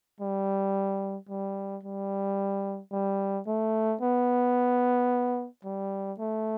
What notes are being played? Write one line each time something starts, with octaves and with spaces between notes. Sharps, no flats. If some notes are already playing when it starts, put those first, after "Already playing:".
G3
G3
G3
G3
A3
B3
G3
A3